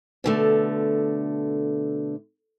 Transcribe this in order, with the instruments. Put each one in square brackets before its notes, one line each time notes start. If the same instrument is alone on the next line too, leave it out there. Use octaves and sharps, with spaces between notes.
[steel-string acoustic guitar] B2 D3 A3